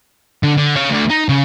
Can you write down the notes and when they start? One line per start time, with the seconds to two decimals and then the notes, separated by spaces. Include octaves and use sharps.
0.43 D3
0.58 D3
0.76 C#5 F5
0.89 D2 D3
1.10 D#4
1.29 C#3